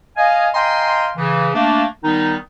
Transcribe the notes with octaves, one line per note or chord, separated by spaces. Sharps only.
D#5 F5 G#5
D#5 F5 G5 G#5 A#5 C6
C#3 E3
A3 A#3 D4
D#3 G3 B3 D#4